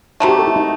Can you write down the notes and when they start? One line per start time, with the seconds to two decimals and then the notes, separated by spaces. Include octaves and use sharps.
0.20 C3 D#3 A3 F#4
0.29 G4
0.39 A4
0.47 E4
0.56 D#4